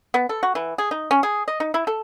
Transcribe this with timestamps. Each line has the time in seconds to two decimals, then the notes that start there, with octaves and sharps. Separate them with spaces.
0.14 B3
0.29 A4
0.43 F#4
0.55 E3
0.78 G#4
0.91 D#4
1.11 C#4
1.23 G#4
1.48 D#5
1.60 D#4
1.74 E4
1.87 A4